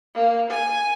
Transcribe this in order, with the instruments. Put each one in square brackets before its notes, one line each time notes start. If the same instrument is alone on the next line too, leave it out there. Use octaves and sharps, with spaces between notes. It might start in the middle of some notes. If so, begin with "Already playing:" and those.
[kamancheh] A#3
G#5